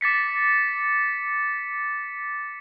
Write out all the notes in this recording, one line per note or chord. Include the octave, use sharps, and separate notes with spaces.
D6 A6 B6 C#7